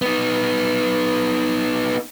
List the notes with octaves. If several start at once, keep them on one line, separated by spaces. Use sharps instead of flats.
B3 D#4